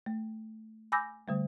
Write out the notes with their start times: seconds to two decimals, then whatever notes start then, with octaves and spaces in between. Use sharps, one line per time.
0.06 A3
0.92 G#5 B5 D6 E6 G6 A#6
1.28 D3 G3 A3